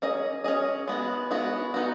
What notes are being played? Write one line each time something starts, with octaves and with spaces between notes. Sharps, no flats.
C#4 G#4 D#5
C#4 G#4 D#5
G#3 B3 F#4
G#3 B3 F#4
B3 D#4 F#4